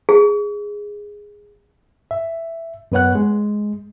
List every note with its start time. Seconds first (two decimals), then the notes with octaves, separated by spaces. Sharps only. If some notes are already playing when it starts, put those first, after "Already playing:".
0.09 G#4
2.11 E5
2.92 F#2 B3 B4 C#5 F#5 F#6
3.15 G#3